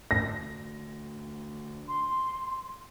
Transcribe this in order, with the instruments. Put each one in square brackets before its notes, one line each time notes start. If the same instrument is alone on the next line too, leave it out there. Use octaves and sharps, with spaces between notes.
[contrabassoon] D2 [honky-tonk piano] A#6
[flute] C6